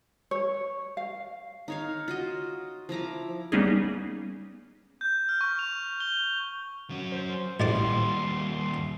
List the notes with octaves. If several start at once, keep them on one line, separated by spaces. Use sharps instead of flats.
C#5
F5
D#4 C#5 F5
F4 F#4 D#5
F3 E4 A#5 D6
G3 A#3 B3 C#4 D#4 G#4
G6
F6
C#6
F7
G7
F#3 C#4
C5
A1 D#2 G3 D5 C6 D6